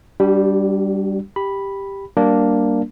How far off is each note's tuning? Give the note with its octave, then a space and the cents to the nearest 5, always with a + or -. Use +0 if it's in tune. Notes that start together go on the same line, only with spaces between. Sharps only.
G3 +0 D4 -10 F#4 +45
G4 +5 B5 -5
G3 -25 A#3 +0 D4 +0